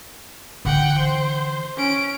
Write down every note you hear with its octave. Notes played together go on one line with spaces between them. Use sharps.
D3 E3 F#5 G5
C5
C#4 D7